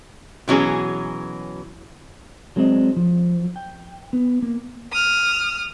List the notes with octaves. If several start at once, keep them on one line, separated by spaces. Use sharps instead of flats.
B2 E3 F#3 C#4 G#4
F#3 G#3 C4 D4 C5 D#5
F3
G5
B3
A#3
D#6 F6